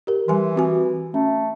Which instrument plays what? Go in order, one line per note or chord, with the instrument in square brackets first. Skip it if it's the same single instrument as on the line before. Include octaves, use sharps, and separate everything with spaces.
[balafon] G4 A#4
[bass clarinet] E3 [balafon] G3 G#5 C6
[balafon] C4 F#4 G#5
[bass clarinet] A3 [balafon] C#4